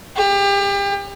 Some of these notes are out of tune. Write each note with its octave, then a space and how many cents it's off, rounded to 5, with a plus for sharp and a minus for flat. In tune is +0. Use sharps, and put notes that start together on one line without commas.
G4 +30